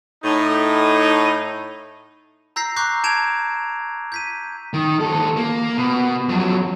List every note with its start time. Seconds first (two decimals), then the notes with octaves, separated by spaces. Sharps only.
0.23 A2 D#4
2.56 A#5 E6 G6 A#6 C7
2.76 A#5 C#6 D6 F#6 G6 C7
3.04 A5 G6 G#6 D7 E7 F7
4.12 G6 B6 D#7
4.73 D#3
5.00 D#2 A4
5.37 A#3
5.77 B2
6.29 F2 F#3